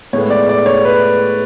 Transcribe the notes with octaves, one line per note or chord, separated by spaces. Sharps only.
A2 G#3 B3 C#5
D5
D5
C#5
B4